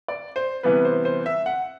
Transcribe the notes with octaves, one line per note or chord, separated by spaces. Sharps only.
D5
C5
C3 E3 G3 B3 B4
C5
C5
E5
F#5